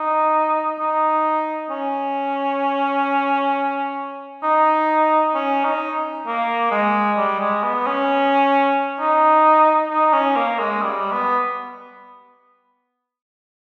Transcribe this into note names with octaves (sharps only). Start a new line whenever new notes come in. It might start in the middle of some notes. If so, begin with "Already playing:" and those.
Already playing: D#4
D#4
C#4
D#4
C#4
D#4
A#3
G#3
G3
G#3
B3
C#4
D#4
D#4
C#4
A#3
G#3
G3
B3